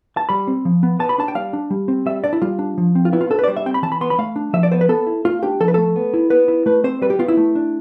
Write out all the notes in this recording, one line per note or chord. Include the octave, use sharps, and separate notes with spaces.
A5
G3 B5
C4
F3
B3
B3 A5
B5
D4 A5
G5
G3 F5
D4
G3
C4
G3 E5
D4 D5
E4
G3 F4
D4
F3
C4
F4
B3 E4
F4
D4 A4
B4
D5
G3 C5
E5
C4 G5
B5
E3 A5
B5
B3 C6
B5
A3 F5
D4
F3 E5
D5
B3 C5
B4
B3 A4
E4
A3 F4
D4 G4
F3 A4
B4
A3 A4
B3
E4
B3 B4
E4
A3 B4
C4 C5
G3 B4
G4
B3 F4
E4
A3
D4